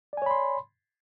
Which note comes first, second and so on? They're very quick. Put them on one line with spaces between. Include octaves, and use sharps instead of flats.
D5 G#5 C#5 B5 C6